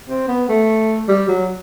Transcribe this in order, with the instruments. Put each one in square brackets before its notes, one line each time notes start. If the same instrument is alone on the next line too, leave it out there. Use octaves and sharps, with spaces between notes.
[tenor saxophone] C4
B3
A3
G3
F#3